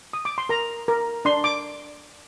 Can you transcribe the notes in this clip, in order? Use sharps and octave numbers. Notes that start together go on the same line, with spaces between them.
D#6
D6
C6
A#4 A#5
A#4
D4 C6
D6